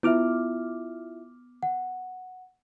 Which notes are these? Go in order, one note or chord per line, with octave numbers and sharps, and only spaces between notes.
B3 E4 F4 E5 D6 F6
F#5